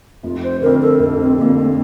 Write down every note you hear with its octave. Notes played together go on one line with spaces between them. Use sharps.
F1 F4
C5
F2 D3 A#4
A4
F1 A#4
C4
F2 D3 A#3
A#3